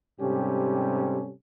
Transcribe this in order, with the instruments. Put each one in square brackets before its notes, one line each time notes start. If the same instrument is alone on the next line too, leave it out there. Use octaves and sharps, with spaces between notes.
[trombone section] G#2 C3 G3 C#4 G4 A4